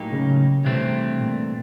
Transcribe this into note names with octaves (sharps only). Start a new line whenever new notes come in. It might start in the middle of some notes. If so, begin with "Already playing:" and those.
Already playing: A2 F#3 A#3 D#4 G4
C#3
G2 C3 E3 A3 C4
A#2